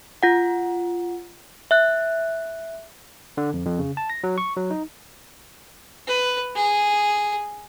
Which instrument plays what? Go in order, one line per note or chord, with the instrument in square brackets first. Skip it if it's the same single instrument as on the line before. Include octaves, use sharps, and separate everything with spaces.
[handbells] F4 F#5
E5 F#6
[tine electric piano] D3
F2
F2
C#3
A5
A#6
F#3
C#6
F#3
D#4
[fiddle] B4
G#4